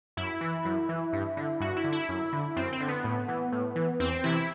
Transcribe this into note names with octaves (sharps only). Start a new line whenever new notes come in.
F#2 E4
E3
F#2
E3
G2
D3
G2 F#4
E4
D3
E4
F#2
D3
F#2 C4
C4
D3
B3
A2
E3
A2
E3
E2 C4
C3 E3 E4